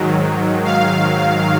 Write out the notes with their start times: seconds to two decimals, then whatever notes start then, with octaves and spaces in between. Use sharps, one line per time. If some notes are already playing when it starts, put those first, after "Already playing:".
Already playing: G#2 D#3 F#3
0.64 F5